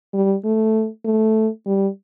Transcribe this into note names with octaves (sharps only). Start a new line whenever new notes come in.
G3
A3
A3
G3